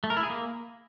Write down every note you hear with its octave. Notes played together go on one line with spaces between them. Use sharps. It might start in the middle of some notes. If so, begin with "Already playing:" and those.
A3
A#4
E4
G#4
A#3